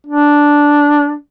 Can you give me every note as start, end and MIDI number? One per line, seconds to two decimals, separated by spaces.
0.07 1.15 62